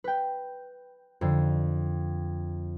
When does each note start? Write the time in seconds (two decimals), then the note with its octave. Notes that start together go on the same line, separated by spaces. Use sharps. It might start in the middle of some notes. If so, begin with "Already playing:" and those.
0.04 B4 G5
1.21 F2 D3